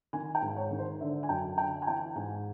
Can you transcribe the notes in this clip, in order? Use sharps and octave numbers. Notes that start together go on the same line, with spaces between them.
D#3 G#5
G5
G#2
C#5
D#3
C5
D3 E5
G#5
F#2 G5
D3 G5
G#5
E3 G5
G#2 G#5